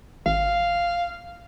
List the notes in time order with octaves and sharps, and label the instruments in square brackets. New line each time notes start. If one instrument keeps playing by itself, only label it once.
[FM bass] G#1 [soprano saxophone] F5